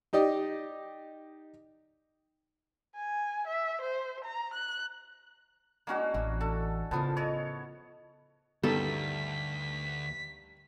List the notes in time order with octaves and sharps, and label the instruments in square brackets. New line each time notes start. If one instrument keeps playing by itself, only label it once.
[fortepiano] D#4 G4 D5 D#5
[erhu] G#5
E5
C5
A#5
F#6
[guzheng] G#3 D4 E4 [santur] A#3 C#4 F#4
[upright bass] A1 E3 [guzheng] E4
[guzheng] D4 [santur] A4
[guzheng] A2 G#4 A#4 [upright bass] C#3 [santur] F3 B3 A5
[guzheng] E4 D#5 [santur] C#5
[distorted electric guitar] D2 [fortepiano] G2 D#3 G3 [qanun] A4 [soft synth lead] B6